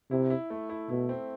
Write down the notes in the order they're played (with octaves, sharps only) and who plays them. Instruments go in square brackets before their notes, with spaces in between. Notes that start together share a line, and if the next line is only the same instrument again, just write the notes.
[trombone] C3 [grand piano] E4
[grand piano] E4
A3
E4
[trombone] B2 [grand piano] E4
[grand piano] C4